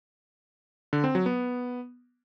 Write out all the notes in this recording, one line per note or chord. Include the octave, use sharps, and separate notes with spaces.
D3
C4
F#3
B3